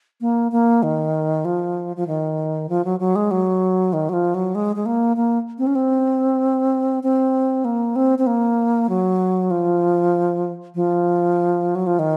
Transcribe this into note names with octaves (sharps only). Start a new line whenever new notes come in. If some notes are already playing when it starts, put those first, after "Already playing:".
A#3
A#3
D#3
F3
F3
D#3
F3
F#3
F#3
G#3
F#3
D#3
F#3
F3
F#3
G#3
G#3
A#3
A#3
C4
C#4
C4
C4
A#3
C4
C4
A#3
F#3
F3
F3
F#3
F3
D#3